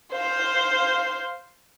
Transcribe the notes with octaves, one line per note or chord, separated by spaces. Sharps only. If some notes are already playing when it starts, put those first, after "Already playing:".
C5 F5